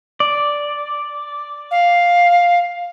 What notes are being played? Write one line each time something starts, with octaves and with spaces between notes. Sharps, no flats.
D5
F5